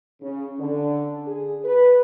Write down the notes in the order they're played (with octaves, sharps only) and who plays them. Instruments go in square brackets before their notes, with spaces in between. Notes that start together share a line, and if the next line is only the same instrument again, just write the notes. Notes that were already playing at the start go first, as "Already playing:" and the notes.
[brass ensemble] C#3
D3
G#4
B4